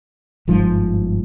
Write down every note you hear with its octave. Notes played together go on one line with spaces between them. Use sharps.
G1 G#2 F3